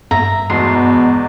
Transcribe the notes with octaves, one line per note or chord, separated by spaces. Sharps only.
G2 E5 A#5
E2 G#2 B2 C6